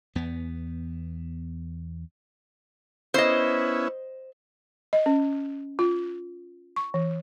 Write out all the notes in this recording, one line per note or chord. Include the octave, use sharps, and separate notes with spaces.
E2 B3
B3 C#4 E4 C5 D#5
D#5
C#4
F4
C#6
E3